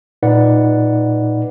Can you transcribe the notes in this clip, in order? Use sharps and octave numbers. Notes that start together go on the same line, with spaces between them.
A#2 D#4 B4 D5 F#5